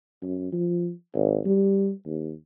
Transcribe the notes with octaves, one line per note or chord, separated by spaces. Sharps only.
F#2
F3
G#1
G3
D#2